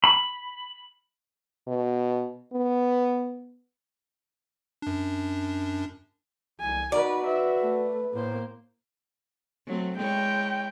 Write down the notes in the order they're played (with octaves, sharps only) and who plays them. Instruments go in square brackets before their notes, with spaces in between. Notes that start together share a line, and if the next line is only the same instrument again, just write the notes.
[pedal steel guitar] B5
[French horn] B2
B3
[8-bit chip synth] F#2 D4
[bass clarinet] C2 [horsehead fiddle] G#5
[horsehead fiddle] D#4 B4 [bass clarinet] F#4 [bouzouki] D5
[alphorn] B4 [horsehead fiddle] E5
[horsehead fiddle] A3
[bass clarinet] A2 [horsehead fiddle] A#3 C5
[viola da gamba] F#3 A3 C4
[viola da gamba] G#3 E4 C#5 [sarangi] G5